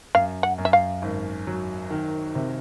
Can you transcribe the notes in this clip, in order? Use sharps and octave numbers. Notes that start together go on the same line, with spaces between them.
F#2 F5
F#5
F#2
E5
F5
G#1
F#3
D#3
C3